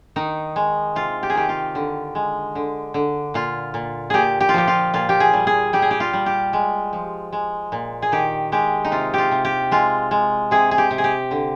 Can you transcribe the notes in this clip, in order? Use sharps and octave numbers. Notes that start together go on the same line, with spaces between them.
D#3 D#4
G#3
C3 F4
G4
G#4
D#3 G4
F4
D3
G#3
D3
D3
A#2 F4
A#2
A#2 G4 G#4
G4
F4
F3 G4
F4
A#2 F4
G4
G#4
G3
G#4
G3 G4
G#4
G4
F4
G3
G4
G#3
F3
G#3
A#2
G#4
D#3 G4
G#3 G4
D#4
C3 F4
F4 G4
C3
G4
G#3 F4
G#3
C3 G#4
G#4
G4
C3
G#4
G4
D3